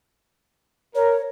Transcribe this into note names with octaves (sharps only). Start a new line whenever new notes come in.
A#4 C#5